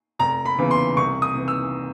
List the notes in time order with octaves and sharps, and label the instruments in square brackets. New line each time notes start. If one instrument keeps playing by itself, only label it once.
[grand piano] F1 A#5
B5
E2 C#3 E3
C6
C2 C#6
D#6
C3 E3
E6